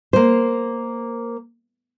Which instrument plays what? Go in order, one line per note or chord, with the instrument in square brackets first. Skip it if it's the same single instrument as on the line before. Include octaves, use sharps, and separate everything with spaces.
[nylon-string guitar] A#3 C5